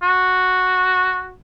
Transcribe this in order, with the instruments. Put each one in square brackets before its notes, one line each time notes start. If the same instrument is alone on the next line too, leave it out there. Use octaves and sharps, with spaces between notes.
[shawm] F#4